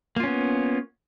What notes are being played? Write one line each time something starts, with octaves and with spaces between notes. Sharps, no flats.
A#3 B3 C#4 F4